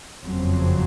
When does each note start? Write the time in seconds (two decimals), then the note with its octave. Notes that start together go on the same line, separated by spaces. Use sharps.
0.24 F#1 F2 C#3 F#3 C4